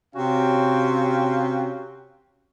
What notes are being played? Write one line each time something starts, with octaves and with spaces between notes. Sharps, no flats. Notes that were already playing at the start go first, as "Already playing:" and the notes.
C3 C#4 F#4 F5 G5